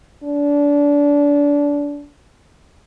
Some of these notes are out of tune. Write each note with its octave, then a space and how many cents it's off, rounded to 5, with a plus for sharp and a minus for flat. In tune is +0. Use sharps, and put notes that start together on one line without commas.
D4 -25